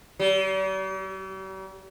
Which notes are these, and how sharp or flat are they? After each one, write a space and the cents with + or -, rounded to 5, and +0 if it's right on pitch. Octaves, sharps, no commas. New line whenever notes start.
G3 -45